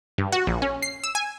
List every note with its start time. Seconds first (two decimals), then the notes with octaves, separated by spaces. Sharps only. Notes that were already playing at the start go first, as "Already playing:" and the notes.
0.18 G2
0.32 F#4
0.47 A#1
0.62 C#4
0.82 C7
1.04 E6
1.15 G#5